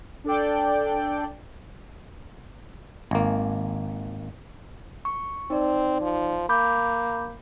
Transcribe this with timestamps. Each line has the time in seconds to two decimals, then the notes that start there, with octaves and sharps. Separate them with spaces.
0.24 D4 A4 D5 G5
3.11 G#1 A#3
5.05 C#6
5.50 C4 D#4 D5
6.01 F3
6.49 A#3 B5 D6 G6